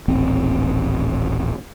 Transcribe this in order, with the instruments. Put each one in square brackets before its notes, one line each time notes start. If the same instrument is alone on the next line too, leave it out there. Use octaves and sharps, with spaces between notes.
[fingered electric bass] D#1 A1 C4